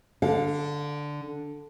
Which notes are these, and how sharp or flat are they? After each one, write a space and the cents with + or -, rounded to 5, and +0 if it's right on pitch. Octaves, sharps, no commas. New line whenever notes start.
D3 +0 F5 +30